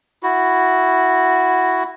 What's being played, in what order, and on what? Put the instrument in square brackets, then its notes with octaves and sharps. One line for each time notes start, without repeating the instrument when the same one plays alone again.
[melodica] E4 F#4